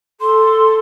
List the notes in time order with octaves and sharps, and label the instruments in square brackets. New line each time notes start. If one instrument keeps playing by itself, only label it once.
[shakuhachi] A4 [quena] C6